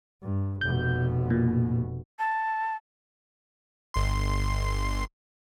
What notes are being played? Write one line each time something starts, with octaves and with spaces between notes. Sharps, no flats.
G2
F1 B2 G6
A#2
A5
G1 C6